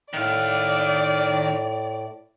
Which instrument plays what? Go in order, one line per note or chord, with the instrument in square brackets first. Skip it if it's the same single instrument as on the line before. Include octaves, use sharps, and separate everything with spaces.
[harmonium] A2 [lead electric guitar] D#3 F5 [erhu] D5